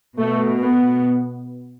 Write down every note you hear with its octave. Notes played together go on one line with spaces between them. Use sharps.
B2 A3
B3